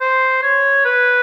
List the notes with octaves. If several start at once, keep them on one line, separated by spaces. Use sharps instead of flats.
C5
C#5
B4